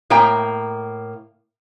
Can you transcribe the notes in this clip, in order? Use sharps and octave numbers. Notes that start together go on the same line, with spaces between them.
A2 A#3 G5 A#5